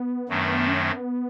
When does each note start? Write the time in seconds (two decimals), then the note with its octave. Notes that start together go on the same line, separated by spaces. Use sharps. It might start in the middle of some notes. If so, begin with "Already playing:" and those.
Already playing: B3
0.29 F#2 D#3 F#3 A3 D4
0.68 C#4
0.81 C4
0.93 B3